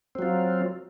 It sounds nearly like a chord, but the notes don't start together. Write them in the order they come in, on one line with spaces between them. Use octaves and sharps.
C4 F#3 F4